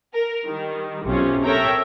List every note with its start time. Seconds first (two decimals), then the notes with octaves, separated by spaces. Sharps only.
0.14 A#4
0.45 D#3 G3
1.04 B1 C3 C#4 F4
1.44 A4 A#4 C#5 E5 G5 A#5